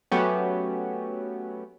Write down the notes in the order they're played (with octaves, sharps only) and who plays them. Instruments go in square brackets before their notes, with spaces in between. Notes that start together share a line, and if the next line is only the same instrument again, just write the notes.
[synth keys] F#3 A3 B3 C#4 F#4 G4